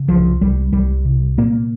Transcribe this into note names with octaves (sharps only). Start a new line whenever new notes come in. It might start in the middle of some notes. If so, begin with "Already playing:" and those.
Already playing: C#3
C2 F3
C2 G3
C2 G3
C3
A#2 A#3